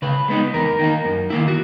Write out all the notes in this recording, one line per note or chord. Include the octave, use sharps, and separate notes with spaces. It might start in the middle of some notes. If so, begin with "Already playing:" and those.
C#3 B4
G#3 B3 D#4
E2 A#4
D#3 A#3 D#4
F#2
D#3 A#3 E4
F#4